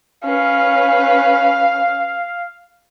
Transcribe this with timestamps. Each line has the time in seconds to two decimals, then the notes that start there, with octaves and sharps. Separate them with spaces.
0.24 C#4 B4 F5